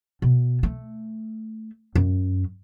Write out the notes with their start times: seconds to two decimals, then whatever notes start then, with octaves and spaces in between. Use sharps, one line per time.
0.22 B2
0.63 A3
1.95 F#2